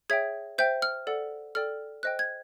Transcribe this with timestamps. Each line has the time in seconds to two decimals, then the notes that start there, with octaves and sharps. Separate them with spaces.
0.10 G#4 C#5 E5 G5 G#6
0.58 C5 E5 G5 G6
0.82 F6
1.07 A4 D5 F#5
1.55 A4 D5 G5 F6
2.03 C5 D#5 G5 F#6
2.19 G#6